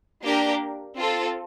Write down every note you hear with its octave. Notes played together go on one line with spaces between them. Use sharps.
A#3 D4 G4 A#4
C4 F4 A4